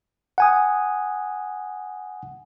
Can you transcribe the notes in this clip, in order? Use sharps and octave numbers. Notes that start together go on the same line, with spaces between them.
F#5 G#5 D#6